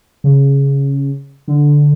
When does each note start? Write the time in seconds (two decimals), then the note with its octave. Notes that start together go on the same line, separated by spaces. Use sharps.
0.24 C#3
1.48 D3